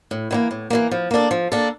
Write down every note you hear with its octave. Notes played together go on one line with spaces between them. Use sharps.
A2
E3 G3 A#3
A2
E3 G3 A#3
F3
A#3 D4 A4
F3
A#3 D4 A4